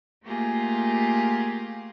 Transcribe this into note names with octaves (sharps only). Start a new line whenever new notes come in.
A3 A#3 F4 G4 G#4